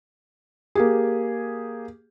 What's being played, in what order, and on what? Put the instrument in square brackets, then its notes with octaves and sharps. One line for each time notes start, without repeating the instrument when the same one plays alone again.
[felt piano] A#3 G4 G#4